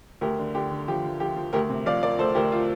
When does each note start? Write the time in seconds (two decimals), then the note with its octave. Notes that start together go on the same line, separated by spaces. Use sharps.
0.21 D2 G4 A#4
0.39 D3
0.55 D3 G4
0.71 D3
0.88 F3 G4
1.04 F3
1.20 F3 G4
1.36 F3
1.53 D2 G4 A#4
1.70 C3
1.86 F3 D5 F5
2.02 F3 A#4 D5
2.18 D2 A4 C5
2.35 D2 G4 A#4
2.52 F4